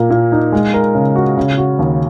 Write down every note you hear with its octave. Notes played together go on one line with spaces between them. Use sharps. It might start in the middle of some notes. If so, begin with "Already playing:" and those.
Already playing: A#2 A#3
A#2
D#4
G#3
A#4
C#3
F#4
C#3
F#4
D#2